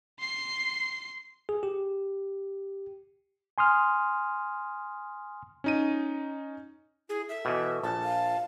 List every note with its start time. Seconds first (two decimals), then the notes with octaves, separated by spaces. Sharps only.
0.19 C6 C7
1.49 G#4
1.63 G4
3.58 G#5 C6 D#6 F6
5.64 C#4 D#4 D#7
7.09 E4 G#4
7.29 A4 E5
7.45 B2 E3
7.83 A#1 A5
8.04 F5